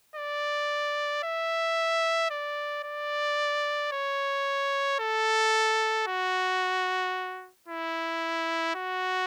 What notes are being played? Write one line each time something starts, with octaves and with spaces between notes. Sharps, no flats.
D5
E5
D5
D5
C#5
A4
F#4
E4
F#4